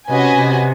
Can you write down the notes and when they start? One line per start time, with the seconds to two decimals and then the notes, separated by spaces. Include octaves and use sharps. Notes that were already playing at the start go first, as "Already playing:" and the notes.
0.09 C3 C#4 F#4 B4 D#5 G#5
0.37 C3